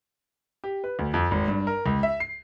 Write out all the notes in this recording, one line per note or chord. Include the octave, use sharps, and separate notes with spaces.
G4
B4
D2
F2
G#1
G2
A#4
C#2
E5
C7